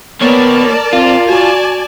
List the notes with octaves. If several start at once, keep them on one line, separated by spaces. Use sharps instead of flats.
A#3 B3 A#4 C#5 D5 A5
C4 F4
F#4 D5 G#5 A5